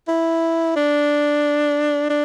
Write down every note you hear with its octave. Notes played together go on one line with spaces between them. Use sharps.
E4
D4
D4